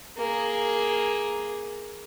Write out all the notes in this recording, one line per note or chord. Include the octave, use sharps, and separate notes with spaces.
A#3 G#4